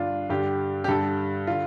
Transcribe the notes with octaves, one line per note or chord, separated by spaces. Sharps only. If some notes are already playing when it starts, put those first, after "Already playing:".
Already playing: G2 D3 D4 F4
G2 D3 G4
G4
G2 D3 A4
D3 F4